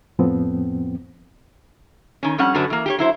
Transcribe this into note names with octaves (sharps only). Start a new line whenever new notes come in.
F2 A2 F3 B3 C4
D#3 C#4
F2 G3 C#4 F#5
F#2 D3 F#4 B4 C#5 A5
E3 A#3
G4 G#4 C#5
F#3 E4 C5